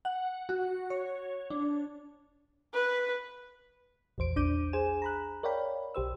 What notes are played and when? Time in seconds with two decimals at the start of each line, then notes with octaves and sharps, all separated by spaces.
0.05 F#5
0.49 F#4
0.90 C#5
1.50 D4
2.74 B4
4.18 A#1 E2 C5 D7
4.36 A#1 D4 D6 G6 D#7
4.73 G#4 C5 G#5 E7
5.02 A#5 B5 F#6
5.43 A#4 C#5 D5 F5 G5 B5
5.95 B1 G4 C5 E6